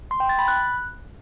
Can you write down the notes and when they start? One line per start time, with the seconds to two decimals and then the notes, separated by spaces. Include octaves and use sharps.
0.11 C6
0.20 G5
0.29 A6
0.39 B5
0.48 F#6